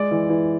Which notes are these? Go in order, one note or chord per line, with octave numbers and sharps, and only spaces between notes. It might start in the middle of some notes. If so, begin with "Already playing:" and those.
Already playing: G#3 D5 D6
E3
E3